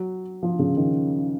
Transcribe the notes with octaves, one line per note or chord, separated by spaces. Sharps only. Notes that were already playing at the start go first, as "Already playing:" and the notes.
Already playing: F#3
F3
C#3
D#3